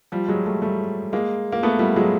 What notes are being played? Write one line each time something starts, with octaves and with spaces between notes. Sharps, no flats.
F3 G3
F#3 G#3
G3 A3
G3 A3
G#3 A#3
A#3
A3 B3
G3 A3
F#3 G#3